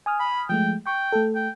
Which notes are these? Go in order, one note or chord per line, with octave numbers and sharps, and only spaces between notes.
G#5 D#6 F6
B5
F3 G#3 A3 G5
G5 C#6
A3 A4
G5